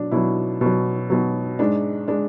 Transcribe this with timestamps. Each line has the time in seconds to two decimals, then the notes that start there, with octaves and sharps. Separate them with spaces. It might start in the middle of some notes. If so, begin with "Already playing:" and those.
Already playing: B2 F#3 D4
0.11 B2 F#3 E4
0.61 B2
0.66 F#3
1.10 B2 F#3
1.59 G#2 G#3 D4
2.08 G#3 D4